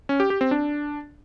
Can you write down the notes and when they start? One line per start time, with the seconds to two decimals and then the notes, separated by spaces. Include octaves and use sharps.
0.09 C#4
0.20 G4
0.30 G4
0.41 C4
0.51 D4